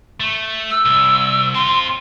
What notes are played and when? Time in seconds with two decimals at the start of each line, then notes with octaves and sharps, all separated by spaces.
0.20 A3
0.71 E6
0.85 C2
1.55 C4 F4 C6